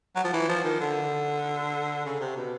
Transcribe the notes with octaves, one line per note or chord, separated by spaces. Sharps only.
F#3
F3
E3
F3
D#3
D3
C#3
C3
B2